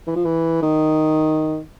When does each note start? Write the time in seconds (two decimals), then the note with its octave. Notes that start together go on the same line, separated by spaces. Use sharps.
0.07 E3
0.16 F3
0.25 E3
0.62 D#3